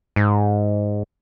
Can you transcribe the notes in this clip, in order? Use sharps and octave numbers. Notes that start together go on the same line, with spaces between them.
G#2